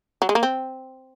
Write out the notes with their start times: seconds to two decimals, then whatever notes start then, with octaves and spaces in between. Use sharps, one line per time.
0.22 F#3
0.29 G#3
0.35 A#3
0.43 C4